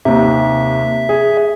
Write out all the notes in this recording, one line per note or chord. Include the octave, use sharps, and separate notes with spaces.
D#2 C3 E5
G#4